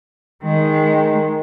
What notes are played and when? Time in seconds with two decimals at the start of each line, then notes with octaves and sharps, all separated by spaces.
0.43 D#3 G#3